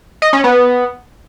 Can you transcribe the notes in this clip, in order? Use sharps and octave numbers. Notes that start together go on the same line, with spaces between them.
D#5
C#4
B3